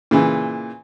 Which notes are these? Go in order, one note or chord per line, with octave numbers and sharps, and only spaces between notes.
A#2 C#3 E3